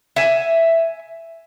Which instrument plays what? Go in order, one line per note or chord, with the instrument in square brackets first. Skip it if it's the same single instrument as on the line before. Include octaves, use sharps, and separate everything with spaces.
[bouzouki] E5 G#5